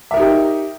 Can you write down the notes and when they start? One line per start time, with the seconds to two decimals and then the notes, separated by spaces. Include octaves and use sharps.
0.11 E5
0.14 A#4
0.17 D#4
0.20 G4